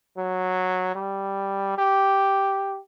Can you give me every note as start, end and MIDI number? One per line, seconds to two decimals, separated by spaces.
0.18 0.92 54
0.95 1.78 55
1.78 2.78 67